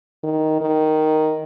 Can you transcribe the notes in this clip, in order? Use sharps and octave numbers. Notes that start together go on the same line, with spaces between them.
D#3
D#3